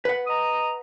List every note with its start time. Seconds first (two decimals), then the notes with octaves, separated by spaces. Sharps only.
0.05 B4 F#5
0.27 D#5 A#5 D#6